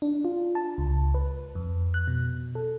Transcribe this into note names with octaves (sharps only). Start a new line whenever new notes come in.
D4
F4
A5
C#2
B4
F2
F#6
B2
A4